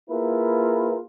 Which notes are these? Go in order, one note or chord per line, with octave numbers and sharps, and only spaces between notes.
A#3 E4 F4 G#4 A#4 B4